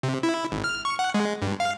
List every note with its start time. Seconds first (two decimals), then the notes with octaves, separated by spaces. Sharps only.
0.03 C3
0.23 E4
0.52 G#1
0.64 F6
0.85 C#6
0.99 F#5
1.14 G#3
1.42 G2
1.60 F5